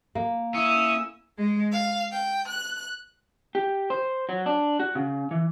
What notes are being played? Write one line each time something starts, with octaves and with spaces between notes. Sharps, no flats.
A#3
C#4 E4 D#6 E6
G#3
F5
G5
F#6
G4
C5
F#3
D4
F#4
C#3
E3